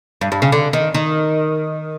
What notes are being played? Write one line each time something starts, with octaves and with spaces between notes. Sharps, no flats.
G2
G2
C#3
D3
D#3
D#3